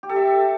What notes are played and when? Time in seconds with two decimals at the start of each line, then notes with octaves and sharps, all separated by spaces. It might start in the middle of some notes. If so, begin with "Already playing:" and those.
0.03 G4
0.09 A4
0.16 E5